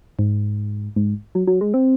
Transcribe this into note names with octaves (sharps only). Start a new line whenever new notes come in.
G#2
G#2
F#3
F#3
G#3
C4